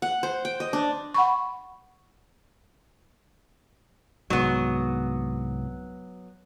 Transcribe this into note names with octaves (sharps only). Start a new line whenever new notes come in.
F#5
C5
G5
D#5
D4
F#5 B5 C#6
C2 G#2 F#3 B3